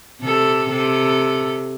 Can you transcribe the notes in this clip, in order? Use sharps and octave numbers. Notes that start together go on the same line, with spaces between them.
C3 A4
C3 A4